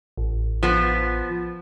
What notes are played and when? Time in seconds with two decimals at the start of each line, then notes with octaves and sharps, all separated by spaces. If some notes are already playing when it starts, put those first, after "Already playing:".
0.18 A1
0.63 F3 B3